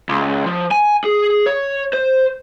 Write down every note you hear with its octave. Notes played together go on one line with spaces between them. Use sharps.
C#2
F3
G#5
G#4
C#5
C5